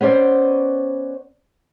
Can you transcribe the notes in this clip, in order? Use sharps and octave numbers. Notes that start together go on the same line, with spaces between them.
B3 C#4 C5 D5